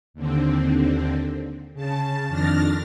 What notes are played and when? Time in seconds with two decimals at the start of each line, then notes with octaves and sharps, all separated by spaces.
0.14 D#2 D3 C4
1.73 C#3 A5
2.28 F2 D#3 D4 F6 A6 A#6